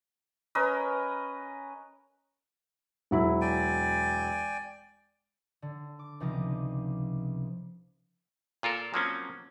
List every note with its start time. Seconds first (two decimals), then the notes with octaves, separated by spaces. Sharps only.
0.55 C#4 A#4 B4 D#5
3.11 E1 F#3 E4
3.41 D5 G5 G#5
5.62 D3
5.99 D6
6.20 C#2 C3 F3 D#4 D6 A#6
8.63 A#2 F4 A4 A#4
8.94 F3 F#3 A#3 C4 C#4